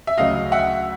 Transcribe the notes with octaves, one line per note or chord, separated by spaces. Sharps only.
E5
D2 C#3 F#3 D#5 F5
E5 F#5